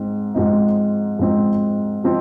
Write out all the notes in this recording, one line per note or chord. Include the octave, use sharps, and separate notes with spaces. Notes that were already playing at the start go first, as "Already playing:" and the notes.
Already playing: G#2 C4 D#4
G#2 F3 C4 D#4
G#2 F3 C4 D#4
F3 C4 D#4